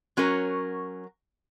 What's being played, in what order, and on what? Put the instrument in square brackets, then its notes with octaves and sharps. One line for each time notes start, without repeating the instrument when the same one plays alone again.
[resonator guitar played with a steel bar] F#3 C#4 F#4 A#4